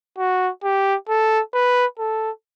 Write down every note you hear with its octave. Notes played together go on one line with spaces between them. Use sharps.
F#4
G4
A4
B4
A4